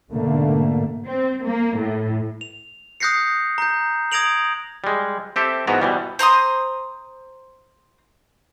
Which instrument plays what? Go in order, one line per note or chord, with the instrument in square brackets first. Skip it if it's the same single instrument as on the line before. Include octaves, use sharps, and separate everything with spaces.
[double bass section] G#2 B2 D3 A3 A#3
[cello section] C4
A#3
A2
[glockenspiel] F7
D#6 F#6 G6 A#6 C7 C#7
A#5 G6
D#6 G#6 A#6 D7 F7 F#7
[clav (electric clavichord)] G3 G#3
C4 G4 A4 E5
G#2 E3 B3 F#4 A#5
B2 E3 G3
[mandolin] C5 A#5 C6 D#6